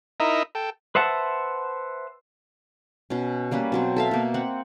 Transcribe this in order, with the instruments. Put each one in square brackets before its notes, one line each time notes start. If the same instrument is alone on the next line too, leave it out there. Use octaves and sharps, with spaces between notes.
[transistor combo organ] D#4 E4 A#4 D#5 E5
A4 G5
[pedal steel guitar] B4 C5 E5 F#5 A5
[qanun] B2 C#4
G3 A#3 C#4 B4
B2 F#3 C4
A4 E5 F5
B2 A#3
C4 F#5